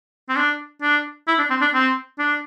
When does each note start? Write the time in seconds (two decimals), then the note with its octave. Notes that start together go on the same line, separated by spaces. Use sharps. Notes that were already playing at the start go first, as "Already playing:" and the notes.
0.29 C4
0.36 D4
0.82 D4
1.28 E4
1.39 D4
1.50 C4
1.61 D4
1.74 C4
2.19 D4